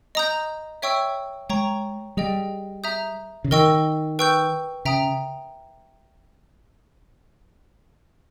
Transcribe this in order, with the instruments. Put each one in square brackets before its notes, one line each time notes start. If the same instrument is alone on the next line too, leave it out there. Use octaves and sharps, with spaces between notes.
[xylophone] D#5 A#5 D#6 G6
C#5 E5 G5 C#6 E6
[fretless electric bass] G#3 [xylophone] C#5 G5 A#5 C#6
[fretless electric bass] G3 [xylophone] G#4 D#5 G5
[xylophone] E5 A#5 D#6 G6
[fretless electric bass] C#3
[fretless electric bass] D#3 [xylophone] A#4 D#5 G5 C#6 E6
[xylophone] B4 G5 C#6 E6 G6
[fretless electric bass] C#3 [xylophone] E5 G5 A#5 D#6